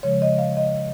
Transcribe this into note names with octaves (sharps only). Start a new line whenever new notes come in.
C#3 F3 G#3 C#5
D#5
F5
D#5